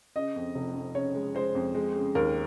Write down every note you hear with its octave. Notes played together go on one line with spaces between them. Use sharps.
C#3 D#5
F2
F1
F2
C#3 C#5
G#3
G#3 C5
F2
G#3
C#3
D#2 A#4